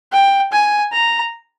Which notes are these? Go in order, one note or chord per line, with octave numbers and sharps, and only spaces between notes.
G5
G#5
A#5